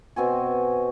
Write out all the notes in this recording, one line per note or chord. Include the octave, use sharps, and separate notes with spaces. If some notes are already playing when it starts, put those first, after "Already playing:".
B2 C4 F#4 G#5